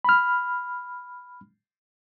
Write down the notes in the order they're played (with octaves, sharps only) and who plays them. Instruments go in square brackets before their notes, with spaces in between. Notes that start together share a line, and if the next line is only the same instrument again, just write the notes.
[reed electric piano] B5 F6